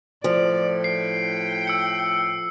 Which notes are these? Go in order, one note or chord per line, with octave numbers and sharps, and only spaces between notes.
A2 F3 D5
G5 C7
E6 C#7